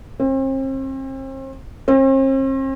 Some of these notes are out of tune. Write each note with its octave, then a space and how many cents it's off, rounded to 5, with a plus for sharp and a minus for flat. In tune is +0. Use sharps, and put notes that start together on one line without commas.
C4 +40
C4 +45